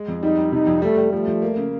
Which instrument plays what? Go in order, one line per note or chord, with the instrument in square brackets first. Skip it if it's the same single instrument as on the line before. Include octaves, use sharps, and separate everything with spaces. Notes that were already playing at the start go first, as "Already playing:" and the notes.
Already playing: [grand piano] G#3
F2
[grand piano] G3 [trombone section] D#4
[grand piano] G3
[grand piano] C3 [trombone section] D#4
[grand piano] F2
[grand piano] G3 [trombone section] A3
[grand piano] G3
[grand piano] F3 [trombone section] A3
[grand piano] F3
A#3
C#3